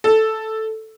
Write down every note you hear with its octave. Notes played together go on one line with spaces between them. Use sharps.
A4